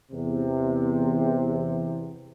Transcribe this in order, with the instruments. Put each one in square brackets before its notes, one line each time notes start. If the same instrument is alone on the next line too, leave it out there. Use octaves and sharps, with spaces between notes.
[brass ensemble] E2 C3